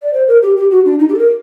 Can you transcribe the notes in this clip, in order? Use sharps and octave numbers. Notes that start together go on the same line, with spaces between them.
D5
C5
A#4
G4
G4
F#4
D4
D#4
G4
A4
A#4